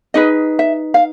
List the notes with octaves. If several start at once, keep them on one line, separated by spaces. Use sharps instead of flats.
D#4 G#4 B4 D#5
E5
F5